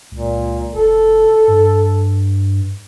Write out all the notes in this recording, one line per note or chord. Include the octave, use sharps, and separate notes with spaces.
C#2 A#2
F1 A4
G2